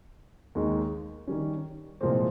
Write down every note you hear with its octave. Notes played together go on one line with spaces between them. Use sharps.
D#2 D#3 G#3 D#4
D#3 G3 C#4
C2 A#2 F3 G#3 C4